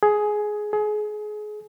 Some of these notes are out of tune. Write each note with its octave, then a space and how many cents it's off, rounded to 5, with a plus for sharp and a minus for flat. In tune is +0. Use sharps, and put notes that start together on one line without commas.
G#4 +15
G#4 +30